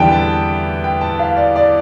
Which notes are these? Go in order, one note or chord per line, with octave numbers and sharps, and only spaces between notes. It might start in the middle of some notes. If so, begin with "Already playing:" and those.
Already playing: E2 D3 G3 G5 A5
A5
G5
A5
F5
D5
D5